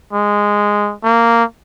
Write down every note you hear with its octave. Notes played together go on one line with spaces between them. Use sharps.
G#3
A#3